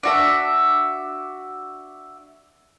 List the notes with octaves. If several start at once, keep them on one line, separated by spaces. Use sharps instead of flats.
D4 F#4 E5